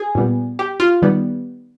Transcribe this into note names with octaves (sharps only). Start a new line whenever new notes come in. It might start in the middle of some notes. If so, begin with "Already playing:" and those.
Already playing: G#4
A#2 G3 B3
G4
F4
D#3 G3 B3